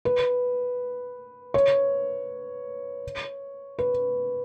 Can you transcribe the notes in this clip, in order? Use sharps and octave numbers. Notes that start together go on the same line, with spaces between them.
B4
C#5
B4